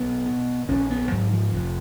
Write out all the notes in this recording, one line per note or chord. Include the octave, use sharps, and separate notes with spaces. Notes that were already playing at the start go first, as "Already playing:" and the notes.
Already playing: B1 B3
B2
A#1 C#4
B3
G#2 F#3
F3
F1